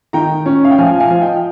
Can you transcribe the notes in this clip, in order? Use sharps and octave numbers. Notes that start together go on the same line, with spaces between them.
D#3 G5 A#5
C#4
F5
G5
F3 F5 G#5
F5 G#5
F3
D#5 G5
G5